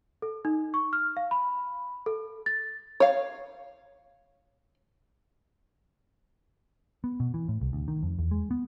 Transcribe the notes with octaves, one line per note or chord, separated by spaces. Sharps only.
A4
D#4
C#6
F6
F5
B5
A4
A6
C#5 F5
B3
B2
E3
A2
C2
D2
D#3
F2
E2
G#3
B3